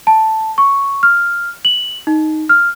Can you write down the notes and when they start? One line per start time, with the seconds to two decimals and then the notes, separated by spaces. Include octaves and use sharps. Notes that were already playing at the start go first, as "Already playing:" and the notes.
0.07 A5
0.58 C#6
1.03 F6
1.65 F#7
2.07 D#4
2.49 F6